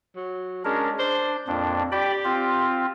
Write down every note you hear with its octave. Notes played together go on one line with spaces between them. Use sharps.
F#3
G#3 C#4 D4 A#4
D4 C5
F2 A#2 D4
G4 D5 G5 B5
C4 F4